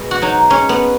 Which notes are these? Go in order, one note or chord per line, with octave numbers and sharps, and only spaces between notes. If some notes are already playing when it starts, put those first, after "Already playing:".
Already playing: B2 G#3
F#4
F#3 D#4
G#3 C#4
B3